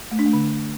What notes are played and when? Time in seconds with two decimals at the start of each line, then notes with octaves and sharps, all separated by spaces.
0.11 A3
0.19 D4
0.26 A3
0.33 D3